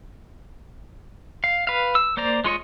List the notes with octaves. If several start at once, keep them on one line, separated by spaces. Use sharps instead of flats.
F5
B4 F5
E6
A#3 C5 D5 A#5
G#3 F4 C#5 D#5